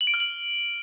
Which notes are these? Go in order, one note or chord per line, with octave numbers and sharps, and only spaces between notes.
F#7
D7
F6
F#7